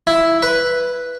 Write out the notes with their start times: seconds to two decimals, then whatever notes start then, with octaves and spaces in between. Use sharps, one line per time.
0.07 E4
0.42 B4